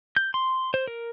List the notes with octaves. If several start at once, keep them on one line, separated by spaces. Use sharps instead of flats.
G6
C6
C5
A#4